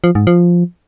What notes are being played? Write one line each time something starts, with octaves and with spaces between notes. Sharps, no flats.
F3
G#2
F3